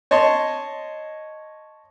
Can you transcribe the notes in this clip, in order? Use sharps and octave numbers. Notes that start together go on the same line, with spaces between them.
C#5 D#5 A5 C6